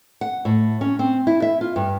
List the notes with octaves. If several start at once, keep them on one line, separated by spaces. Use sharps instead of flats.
F#5
A2
C#4
C4
E4
E5
F4
G2